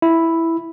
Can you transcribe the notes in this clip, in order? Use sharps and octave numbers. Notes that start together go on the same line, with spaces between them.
E4